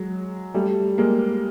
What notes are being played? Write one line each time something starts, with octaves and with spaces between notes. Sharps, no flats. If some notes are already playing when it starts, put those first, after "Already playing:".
Already playing: F#3 G#3
G3 A3
G#3 A#3